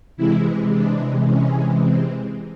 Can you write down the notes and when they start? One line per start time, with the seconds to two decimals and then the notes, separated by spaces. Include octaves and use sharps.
0.17 C3 E3 G#3 E4
0.73 D4
1.28 C#4
1.84 C4